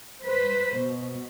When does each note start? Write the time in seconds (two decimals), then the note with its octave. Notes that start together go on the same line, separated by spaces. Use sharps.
0.24 B4 C5
0.78 B2